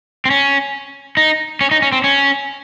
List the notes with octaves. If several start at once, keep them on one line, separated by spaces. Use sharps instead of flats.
C4
C#4
D#4
C#4
D#4
C#4
C4
C#4